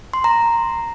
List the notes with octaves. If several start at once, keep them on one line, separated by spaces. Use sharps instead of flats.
C6
A#5